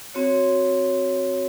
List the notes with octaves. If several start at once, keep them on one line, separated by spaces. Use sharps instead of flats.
C4 F#4 C#5